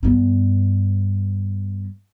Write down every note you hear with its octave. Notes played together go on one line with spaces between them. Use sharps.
G2 B3